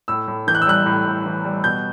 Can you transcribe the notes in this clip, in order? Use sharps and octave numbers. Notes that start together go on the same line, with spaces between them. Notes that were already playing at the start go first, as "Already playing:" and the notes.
A2 E6
A2
E3 G6
F#6
E6
G3 F#6
A2
A2
E3
G3
B2 G6